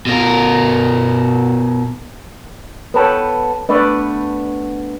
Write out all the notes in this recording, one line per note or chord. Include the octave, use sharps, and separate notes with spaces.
B2 A#4
B3 A4 B4 C#5 G5
A3 B3 D4 B4 D5